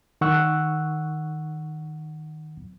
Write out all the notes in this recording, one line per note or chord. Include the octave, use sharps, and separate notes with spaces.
D#3 F#5 C#6 E6 F#6